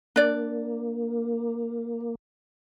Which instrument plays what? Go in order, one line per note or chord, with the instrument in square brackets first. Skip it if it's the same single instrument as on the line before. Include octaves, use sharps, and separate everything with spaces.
[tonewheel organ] A#3 [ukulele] D4 D5